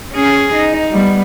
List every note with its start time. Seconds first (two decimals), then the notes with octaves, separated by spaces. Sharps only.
0.13 C#4 G#4
0.55 D#4
0.92 G3 B3